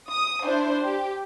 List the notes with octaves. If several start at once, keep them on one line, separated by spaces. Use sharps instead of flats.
D#6
D4 E4 C5
G4